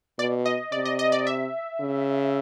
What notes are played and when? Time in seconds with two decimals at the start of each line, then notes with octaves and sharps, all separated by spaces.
0.19 B2 D5
0.46 D#5
0.72 C3 D5
0.85 D#5
0.99 D#5
1.12 D5
1.27 E5
1.80 C#3